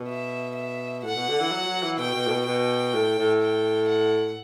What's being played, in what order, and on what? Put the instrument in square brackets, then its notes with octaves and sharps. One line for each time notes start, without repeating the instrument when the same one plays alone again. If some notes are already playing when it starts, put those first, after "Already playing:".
Already playing: [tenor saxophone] B2
[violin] E5
E5
[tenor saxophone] A2 [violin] F#5
[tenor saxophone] B2
D3
E3
F#3
F#3
E3
[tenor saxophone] B2 [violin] G5
[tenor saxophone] B2
A2
B2
[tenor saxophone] B2 [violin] G5
[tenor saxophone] A2
A2
[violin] G5
F#5